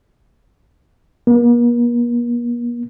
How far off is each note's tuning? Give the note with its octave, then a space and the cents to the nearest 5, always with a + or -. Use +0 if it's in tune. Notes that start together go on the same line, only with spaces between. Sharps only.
A#3 +45